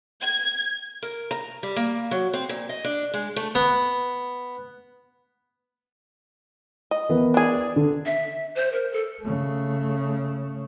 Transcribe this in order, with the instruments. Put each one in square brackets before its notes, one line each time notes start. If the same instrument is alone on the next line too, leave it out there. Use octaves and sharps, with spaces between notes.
[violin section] G#6
[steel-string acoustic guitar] A#4
A#5
G3
A#3
F#3
C4
A#2
D#5
D4
G#3
A3
[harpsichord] B3
[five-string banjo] D#5
[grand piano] E3 B3 A#4
[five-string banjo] D4 G#4
[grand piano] D3
[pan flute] E5
C5
A#4
A4
[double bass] C#3 A3